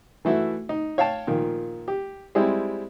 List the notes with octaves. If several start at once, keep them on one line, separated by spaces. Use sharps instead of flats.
E3 A3 E4 F#4
D#4
C#5 F5 G5 A5
A#2 D#3 F3
G4
G3 G#3 C4 E4